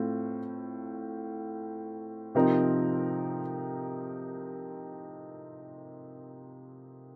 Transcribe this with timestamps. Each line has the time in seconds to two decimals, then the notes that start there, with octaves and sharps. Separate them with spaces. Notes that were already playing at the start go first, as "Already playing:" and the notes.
Already playing: A2 A3 C4 F4
2.35 C3 F3 C4 D#4 A#4